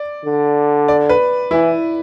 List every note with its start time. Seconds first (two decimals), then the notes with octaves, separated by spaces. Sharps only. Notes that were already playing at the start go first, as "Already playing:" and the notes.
Already playing: D5
0.25 D3
0.88 D5
1.09 B4
1.51 E3 E4